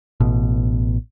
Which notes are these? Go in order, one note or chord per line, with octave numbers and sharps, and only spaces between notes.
A1 B2